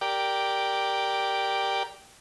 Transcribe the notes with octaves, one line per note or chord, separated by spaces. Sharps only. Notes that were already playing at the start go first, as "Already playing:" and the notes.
G4 A#4 D5 G5